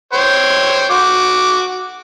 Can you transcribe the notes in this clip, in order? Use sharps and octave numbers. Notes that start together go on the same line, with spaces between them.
C5 C#5 G5
F#4 D6